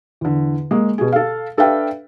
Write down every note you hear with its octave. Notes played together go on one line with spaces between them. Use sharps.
E2 D3
G#3 A#3
B2 G#4
A4 F5
D4 A4 B4 E5 F5 G5